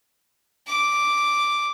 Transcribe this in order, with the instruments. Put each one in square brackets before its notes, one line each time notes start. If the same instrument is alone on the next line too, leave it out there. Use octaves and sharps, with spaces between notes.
[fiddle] D6